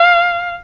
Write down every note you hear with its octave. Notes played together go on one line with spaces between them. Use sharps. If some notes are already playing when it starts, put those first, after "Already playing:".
Already playing: F5